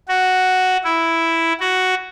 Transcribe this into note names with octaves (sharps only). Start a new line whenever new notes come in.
F#4
E4
F#4